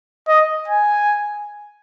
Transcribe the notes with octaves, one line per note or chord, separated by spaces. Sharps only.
D#5
G#5